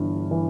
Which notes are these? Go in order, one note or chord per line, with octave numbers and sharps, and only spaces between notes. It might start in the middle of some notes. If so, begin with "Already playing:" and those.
Already playing: G1 G2 E3
E3